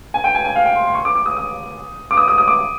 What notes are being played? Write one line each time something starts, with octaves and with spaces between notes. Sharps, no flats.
G#5
G5
G#5
G#5
F5
G5
C6
C6
C#6
D6
D6
D#6
D#6
D6
D#6
D#6
D#6
D6